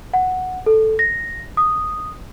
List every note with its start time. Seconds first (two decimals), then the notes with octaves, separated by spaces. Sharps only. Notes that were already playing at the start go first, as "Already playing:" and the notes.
0.14 F#5
0.66 A4
0.99 A#6
1.57 D#6